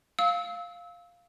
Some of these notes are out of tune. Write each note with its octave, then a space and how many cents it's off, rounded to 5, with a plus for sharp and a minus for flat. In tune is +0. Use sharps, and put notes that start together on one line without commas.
F5 +0 E6 -25